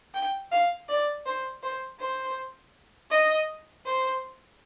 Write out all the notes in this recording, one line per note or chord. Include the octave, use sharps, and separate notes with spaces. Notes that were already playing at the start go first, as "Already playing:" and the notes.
G5
F5
D5
C5
C5
C5
D#5
C5